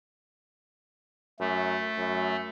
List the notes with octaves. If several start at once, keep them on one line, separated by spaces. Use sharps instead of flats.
F#2 A3
F#2